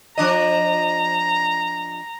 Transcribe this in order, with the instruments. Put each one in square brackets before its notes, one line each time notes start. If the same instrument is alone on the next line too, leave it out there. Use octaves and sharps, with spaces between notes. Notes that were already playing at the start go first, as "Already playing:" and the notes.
[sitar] F3 D4 D#5 [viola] A#5